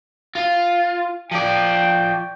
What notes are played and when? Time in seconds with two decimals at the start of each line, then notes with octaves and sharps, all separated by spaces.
0.35 F4
1.31 F3 D5 G5